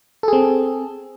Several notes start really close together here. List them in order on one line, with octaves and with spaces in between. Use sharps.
A4 G#4 C4